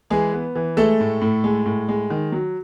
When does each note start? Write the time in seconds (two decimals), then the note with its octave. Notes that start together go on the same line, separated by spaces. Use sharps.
0.10 E3 G#3 G#4
0.33 B3
0.55 E3
0.77 G#3 A3 A4
1.00 A2
1.21 A2
1.44 G#3
1.66 A2
1.89 G#3
2.10 D#3
2.32 F#3